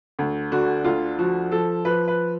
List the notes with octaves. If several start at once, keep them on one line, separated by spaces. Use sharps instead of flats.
D2
D3 F#4
D2 F4
F3 F#4
F3 A4
F3 B4
B4